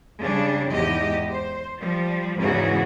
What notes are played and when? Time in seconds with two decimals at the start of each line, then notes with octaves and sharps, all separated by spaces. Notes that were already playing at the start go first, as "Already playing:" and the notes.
0.22 C#3 G3 D4
0.71 E2 G#2 G4 D#5
1.30 C5
1.81 F3 G3
2.38 E2 G#2 C#3 E3 F#4